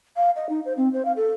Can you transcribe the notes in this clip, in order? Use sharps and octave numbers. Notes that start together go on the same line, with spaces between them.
F5
D#5
D#4
C5
C4
C5
F5
A4